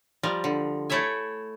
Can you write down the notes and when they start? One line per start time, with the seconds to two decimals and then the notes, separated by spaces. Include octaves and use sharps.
0.23 F3 G3 A#4
0.44 D3
0.90 A3 E4 C#5 E5 G#5